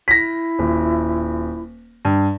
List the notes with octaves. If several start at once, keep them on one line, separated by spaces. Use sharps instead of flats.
E4 A#6 B6
D#1
G2